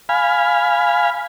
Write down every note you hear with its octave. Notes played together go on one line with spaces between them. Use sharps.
F5 G#5 B5